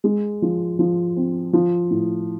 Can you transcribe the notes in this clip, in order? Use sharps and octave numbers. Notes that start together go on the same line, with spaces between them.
G#3
F3
F3
C4
F3
A2